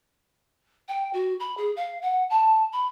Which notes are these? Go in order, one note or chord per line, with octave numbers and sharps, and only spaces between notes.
G5
F#4
B5
G#4
F5
F#5
A5
B5